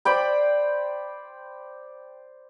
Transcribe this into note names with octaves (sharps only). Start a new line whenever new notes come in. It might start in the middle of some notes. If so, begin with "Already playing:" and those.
C5 D5 G5 B5